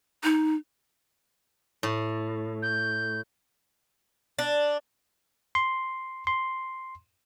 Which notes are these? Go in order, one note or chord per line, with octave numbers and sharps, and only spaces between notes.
D#4
A2
G6
D4
C6
C6